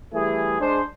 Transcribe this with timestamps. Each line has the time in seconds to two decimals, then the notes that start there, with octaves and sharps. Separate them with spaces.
0.13 E3 G3 A3 G#4
0.61 G#3 D4 G#4 C5